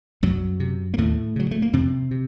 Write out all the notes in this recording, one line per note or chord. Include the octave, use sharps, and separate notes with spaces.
C2 F#2 F#3
C3
A#3
D#2 A2 A3
C#3 F#3
A3
A#3
F2 C3 C4
C3